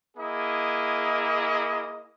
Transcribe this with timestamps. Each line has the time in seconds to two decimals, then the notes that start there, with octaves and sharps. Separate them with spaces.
0.17 A#3 E4 G#4 D#5